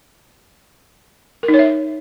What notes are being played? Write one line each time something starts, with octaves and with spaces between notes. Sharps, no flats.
A#4
D#4
C#5
E5